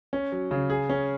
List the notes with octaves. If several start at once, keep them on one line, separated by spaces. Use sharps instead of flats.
C#4
F#3
C#3
G#4
C#4